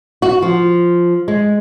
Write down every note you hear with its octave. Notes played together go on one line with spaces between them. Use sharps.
F#4
F3
G#3